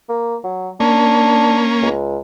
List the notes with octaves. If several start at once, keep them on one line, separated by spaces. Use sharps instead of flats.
A#3
F#3
A#3 C#4 D4
C#2